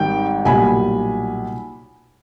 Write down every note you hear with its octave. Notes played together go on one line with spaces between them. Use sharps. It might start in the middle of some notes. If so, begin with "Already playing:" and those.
Already playing: G#1 G#2 D#3 G3 G5
B1 A#2 G3 G#5 B5